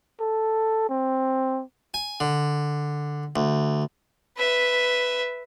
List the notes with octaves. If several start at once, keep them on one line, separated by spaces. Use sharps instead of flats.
A4
C4
G#5
D3
D2
B4 E5